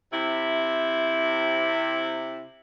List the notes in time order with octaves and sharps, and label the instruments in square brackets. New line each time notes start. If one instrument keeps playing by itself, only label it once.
[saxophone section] C3 E4